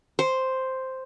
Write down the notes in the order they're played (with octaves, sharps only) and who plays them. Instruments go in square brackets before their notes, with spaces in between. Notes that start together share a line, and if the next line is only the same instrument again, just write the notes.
[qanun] C5